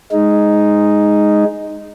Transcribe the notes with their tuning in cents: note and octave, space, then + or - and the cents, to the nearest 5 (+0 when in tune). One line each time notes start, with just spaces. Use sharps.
G#3 +0 D#4 +0